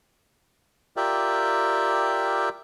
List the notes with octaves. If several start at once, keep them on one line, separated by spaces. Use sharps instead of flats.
F4 G4 A#4 D5 E5 G5